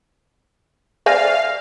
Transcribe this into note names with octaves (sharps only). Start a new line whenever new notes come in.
C5 D5 E5 F5 G#5